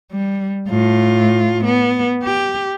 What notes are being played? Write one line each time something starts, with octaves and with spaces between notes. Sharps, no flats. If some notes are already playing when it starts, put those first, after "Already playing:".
G3
A2 F4
B3
G4